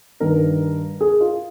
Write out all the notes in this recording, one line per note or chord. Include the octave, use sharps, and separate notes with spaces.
G2 D#3 A#4
G#4
F4